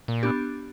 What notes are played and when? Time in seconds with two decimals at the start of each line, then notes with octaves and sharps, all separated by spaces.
0.08 A#2
0.23 B3 D4 G4